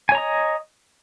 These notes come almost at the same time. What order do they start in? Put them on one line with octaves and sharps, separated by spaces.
G#5 C#5 A#5 D#5